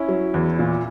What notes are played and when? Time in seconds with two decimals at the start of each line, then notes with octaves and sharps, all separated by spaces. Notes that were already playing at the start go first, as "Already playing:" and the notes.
Already playing: C#4 E4
0.08 F#3
0.34 E2
0.59 A#2